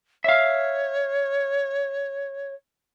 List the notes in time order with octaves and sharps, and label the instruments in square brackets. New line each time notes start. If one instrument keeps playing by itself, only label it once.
[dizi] C#5 [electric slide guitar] E5 F5